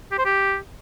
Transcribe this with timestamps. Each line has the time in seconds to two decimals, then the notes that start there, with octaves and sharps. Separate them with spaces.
0.12 G4
0.18 C5
0.25 G4